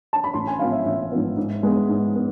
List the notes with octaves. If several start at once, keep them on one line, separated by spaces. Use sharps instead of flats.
A5
B5
A1 C6
G#5
G#2 F3 B3 F5
E5
A1 E5
G#2 F3 B3
G#2
G#3 B3
G#2
B3